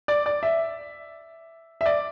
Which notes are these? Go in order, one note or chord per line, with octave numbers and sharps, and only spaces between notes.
D5
D5
E5
E5
D5